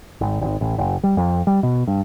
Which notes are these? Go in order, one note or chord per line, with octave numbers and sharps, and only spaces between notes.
G#1
G#1
A1
F#1
G3
F2
G3
B2
G2